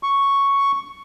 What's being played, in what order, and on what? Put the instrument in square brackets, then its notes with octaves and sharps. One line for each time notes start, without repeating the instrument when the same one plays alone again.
[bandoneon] C#6